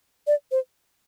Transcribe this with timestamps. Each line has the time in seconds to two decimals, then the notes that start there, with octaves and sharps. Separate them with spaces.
0.27 D5
0.51 C5